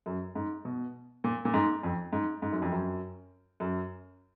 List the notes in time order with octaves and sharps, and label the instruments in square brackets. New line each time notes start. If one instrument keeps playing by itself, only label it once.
[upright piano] F#2
G#2
B2
A#2
A#2
G#2
F2
G#2
G#2
F#2
F2
F#2
F#2